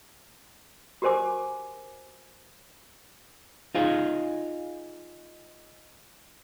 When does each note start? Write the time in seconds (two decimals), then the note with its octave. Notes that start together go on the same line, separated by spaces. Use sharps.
1.02 F#4 G4 A#4 C5 G#5 D6
3.75 D#4 F4 G#4